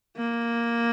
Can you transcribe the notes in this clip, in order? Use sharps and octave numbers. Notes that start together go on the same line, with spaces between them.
A#3